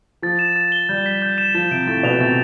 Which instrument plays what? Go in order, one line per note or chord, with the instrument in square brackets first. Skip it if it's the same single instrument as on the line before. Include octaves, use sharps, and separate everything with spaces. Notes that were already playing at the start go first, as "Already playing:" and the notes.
[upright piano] F3 [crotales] A6
[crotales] E7
A6
G7
[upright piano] G3 [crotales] G6
[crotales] B6
G6
E7
[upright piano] F3 [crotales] A6
[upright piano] C3 [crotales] D7
[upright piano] A2 [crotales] A6
[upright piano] B2 [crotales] F7
[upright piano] C3 [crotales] A6